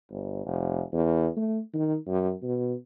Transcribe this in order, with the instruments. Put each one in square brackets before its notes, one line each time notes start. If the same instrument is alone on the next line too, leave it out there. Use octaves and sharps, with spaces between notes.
[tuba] G1
F1
E2
A3
D#3
F#2
B2